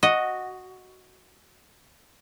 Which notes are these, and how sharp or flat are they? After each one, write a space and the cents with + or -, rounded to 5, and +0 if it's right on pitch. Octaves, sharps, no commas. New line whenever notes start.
F#4 +0 D#5 +0